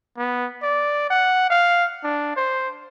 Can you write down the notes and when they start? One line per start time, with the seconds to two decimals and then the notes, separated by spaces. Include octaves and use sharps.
0.18 B3
0.63 D5
1.10 F#5
1.50 F5
2.04 D4
2.37 C5